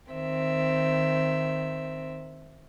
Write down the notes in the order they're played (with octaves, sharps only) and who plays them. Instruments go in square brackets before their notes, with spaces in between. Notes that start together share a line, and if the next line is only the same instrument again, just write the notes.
[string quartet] D#3 C4 E5